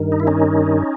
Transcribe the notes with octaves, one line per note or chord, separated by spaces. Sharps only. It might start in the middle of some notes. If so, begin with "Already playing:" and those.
Already playing: G2 D#3
D#4
E4
C#4 D#4